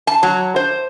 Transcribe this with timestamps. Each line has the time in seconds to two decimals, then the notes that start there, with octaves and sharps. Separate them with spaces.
0.07 A5
0.23 F#3
0.56 C5